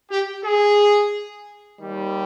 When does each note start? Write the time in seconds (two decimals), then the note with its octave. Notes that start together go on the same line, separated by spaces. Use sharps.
0.10 G4
0.43 G#4
1.79 D#2 D#3 G3